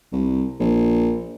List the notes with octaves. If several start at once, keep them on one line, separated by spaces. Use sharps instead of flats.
C2
A#1